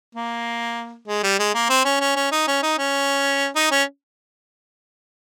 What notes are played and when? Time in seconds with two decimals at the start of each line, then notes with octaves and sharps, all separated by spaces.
0.15 A#3
1.08 G#3
1.23 G3
1.39 G#3
1.55 A#3
1.70 C4
1.85 C#4
2.00 C#4
2.16 C#4
2.32 D#4
2.47 C#4
2.63 D#4
2.78 C#4
3.56 D#4
3.71 C#4